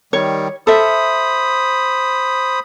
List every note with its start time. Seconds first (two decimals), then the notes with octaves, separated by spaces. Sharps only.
0.13 D#3 G3 C#5
0.67 A4 C5 E5 B5 D#6